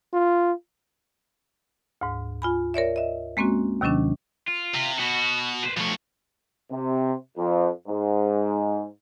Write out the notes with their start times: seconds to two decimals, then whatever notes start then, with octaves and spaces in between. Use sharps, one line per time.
0.13 F4
2.01 D2 G#2
2.42 F4 G#5 B5
2.74 A#4 C#5 D5 E5
2.96 D#5 E5
3.37 G#3 A#3 C4 C#4 F#4
3.81 D#2 C3 D#3 F#3 C#4 D4
4.48 F4
4.74 C3
4.99 B2 F#4
5.64 B4 C5
5.77 B2 F3 A3 C#5
6.71 C3
7.37 F2
7.88 G#2